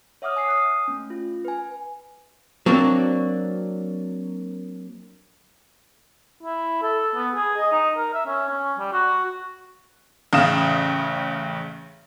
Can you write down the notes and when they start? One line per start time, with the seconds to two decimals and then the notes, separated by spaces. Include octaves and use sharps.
0.22 C#5 E5 F#5 D6 D#6 F6
0.37 G#5 D#6 C7
0.49 D#6 F#6
0.88 A3 C#4
1.10 F4
1.45 B4 G#5
2.66 F#3 A#3 C4 D4
6.43 E4
6.82 A4
7.15 B3
7.35 G#4
7.57 D#5
7.72 D#4
7.97 A#4
8.14 E5
8.27 C#4
8.48 C#4
8.79 G3
8.93 F#4
10.33 A1 C#3 F5 D#6 E7